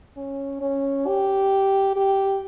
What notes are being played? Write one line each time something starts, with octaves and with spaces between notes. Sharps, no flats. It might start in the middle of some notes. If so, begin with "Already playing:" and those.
C#4
C#4
G4
G4